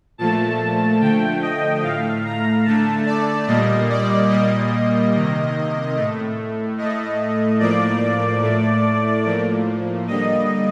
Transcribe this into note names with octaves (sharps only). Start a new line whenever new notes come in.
A#2 F3 A3 A5
D3 F3 A3 G5
D#5
A2 A3 F5
A#5
D3 A3 A5
D5
A#2 G3 A#3 D#5
D5
A#2 G3 A#3 D#5
C3 D#3 A#3
A2 A3
A2 A3 D#5
A2 F3 A#3 D5
A2 A3
A2 F3 A#3
D3 G3 A#3 D#5